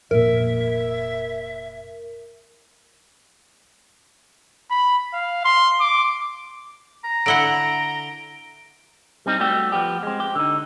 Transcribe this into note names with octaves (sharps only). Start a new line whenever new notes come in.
F1 A#2 A#4 E5
B5
F5
C6
D6
A#5
D3 E4 F#5 D7 G7
G3 C4 D#4
G3 A3 F#4 G4
F3 B3 G4
G#3 C4
G4
D3 D#4